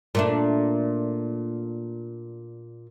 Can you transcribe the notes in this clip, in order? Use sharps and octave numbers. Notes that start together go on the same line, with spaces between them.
A#2 A3 D4